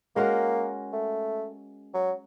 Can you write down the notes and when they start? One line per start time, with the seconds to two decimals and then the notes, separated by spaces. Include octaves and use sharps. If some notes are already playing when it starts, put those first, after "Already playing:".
0.16 G#3 A#3 C#4 F#4 A#4
0.93 A3
1.94 F#3